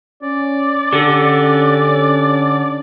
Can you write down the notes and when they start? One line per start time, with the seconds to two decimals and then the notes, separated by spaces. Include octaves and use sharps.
0.23 C#4 D5
0.93 D3 G4 A4